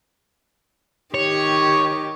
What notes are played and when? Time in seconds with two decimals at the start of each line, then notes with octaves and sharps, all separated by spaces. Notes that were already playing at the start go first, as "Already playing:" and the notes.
1.14 D#3 G4 C#5